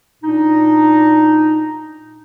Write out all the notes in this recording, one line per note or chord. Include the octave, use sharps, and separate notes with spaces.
A#2 D4 D#4